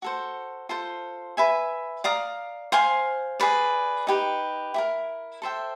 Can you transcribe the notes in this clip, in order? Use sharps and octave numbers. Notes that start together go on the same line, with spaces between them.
F#4 A4 C5
F4 A4 C5
B4 E5 G#5
D5 F5 A#5 D#6
C5 F5 G#5 C6
G#4 B4 D5
D#4 G4 B4
E4 G4 A#4
A4 C5 E5 G5